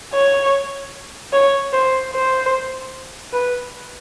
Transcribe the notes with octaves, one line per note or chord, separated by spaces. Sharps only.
C#5
C#5
C5
C5
B4